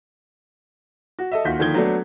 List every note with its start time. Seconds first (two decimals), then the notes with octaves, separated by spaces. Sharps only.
1.19 F#4
1.32 A4 D#5 E5
1.45 D#2 F4 F#4 G6 B6
1.59 D3 D#3 F3 A#3 G#6 G7
1.74 F#3 A3 B3 D4